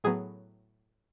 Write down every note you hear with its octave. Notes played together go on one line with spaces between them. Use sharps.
A2 F#3 B3 G#4